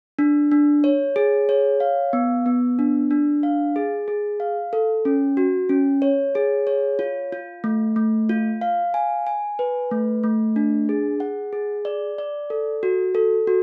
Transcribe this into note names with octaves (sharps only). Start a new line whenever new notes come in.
D4
D4
C#5
G#4
C#5
F5
B3
B3
D4
D4
F5
G#4
G#4
F5
A4
C#4
F#4
C#4
C#5
G#4
C#5
F4
F4
A3
A3
F4
F5
G#5
G#5
B4
A3
A3
D4
G#4
F#5
G#4
D5
D5
A4
F#4
A4
F#4